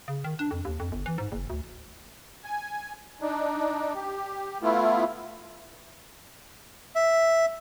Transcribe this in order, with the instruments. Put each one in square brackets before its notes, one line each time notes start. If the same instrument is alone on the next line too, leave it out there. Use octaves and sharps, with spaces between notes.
[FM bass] C#3
D#3
D4
F2
D#2
F2
G1
E3
G#2
F#1
D2
[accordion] G#5
D4 D#4
G4
A3 B3 E4 F4
[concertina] E5